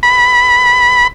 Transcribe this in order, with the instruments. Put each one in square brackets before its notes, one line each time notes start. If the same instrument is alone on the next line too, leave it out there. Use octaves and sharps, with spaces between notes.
[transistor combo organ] B5